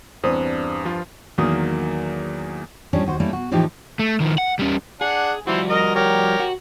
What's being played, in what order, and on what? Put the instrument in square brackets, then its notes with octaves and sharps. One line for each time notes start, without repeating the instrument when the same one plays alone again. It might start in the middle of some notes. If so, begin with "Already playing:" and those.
[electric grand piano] E2 [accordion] G2 [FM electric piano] C4 D5 D#6 [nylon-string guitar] C5
[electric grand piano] F3 F4
[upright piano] E2 D#3 F#3 A#3 D#6
[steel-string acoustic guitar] A2 F3 G3 C#4 D4
D#2 F#4 C5
G3 A3 A#3 C#4 E4
B2 F#4
A2 E3 F3 A#3 D#4 G4
[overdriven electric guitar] A3
D#3 F3
F#5
G3 C#4
[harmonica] D4 F#5 [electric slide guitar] G#4
[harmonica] E3 E4 C5 [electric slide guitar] F3 G3 F#4
[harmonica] A#4 D#5
G4 A#4 C#5
[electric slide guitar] F#4